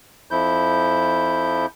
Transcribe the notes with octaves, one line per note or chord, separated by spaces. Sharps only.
F2 F3 E4 G6